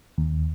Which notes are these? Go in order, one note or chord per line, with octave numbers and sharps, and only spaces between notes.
D#2